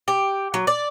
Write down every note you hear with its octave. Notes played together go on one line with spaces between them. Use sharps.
G4
F#3
D5